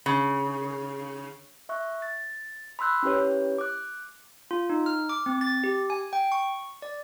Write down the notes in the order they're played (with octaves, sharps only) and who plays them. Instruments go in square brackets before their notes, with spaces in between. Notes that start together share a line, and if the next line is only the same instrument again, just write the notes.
[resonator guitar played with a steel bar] C#3
[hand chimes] E5 C#6 F#6
A6
B5 C6 E6 F#6 G6
C#4 E4 G4 B4 C#5
D6 F#6
[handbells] F4
D#4
F6
D6
C4
A6
G4
G#5
G5
C#6
D5